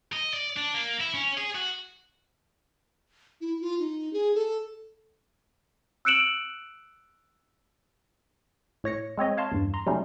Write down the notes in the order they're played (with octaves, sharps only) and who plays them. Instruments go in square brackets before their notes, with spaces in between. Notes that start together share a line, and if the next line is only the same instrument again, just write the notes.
[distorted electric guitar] D#5
D5
D4
A#3
E4
C#4
G#4
F#4
[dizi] E4
F4
D#4
G#4
A4
[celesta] E6 F#6 C#7 D7 E7 F#7
[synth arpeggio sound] A2 C#5 A#6 C#7
G#3 C4 C#5 D#5
C#5 F5 A5 C6
E2 G2
A#5 C6
C3 F#3 G3 A3 C#4 D#4